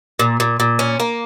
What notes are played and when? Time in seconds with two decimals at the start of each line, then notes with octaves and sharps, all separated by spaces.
0.19 A#2
0.40 A#2
0.60 A#2
0.79 C#4
1.00 A#3